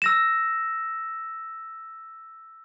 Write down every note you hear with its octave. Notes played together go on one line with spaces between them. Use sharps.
E6 A#6 E7